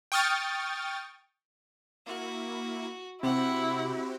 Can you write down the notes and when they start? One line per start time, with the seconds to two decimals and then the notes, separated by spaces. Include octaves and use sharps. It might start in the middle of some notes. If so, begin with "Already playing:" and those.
0.12 G5 C#6 D#6 F6 A6
2.06 A#3 E4 F#4
3.23 C3 C4 E4 F#4 G4 F#5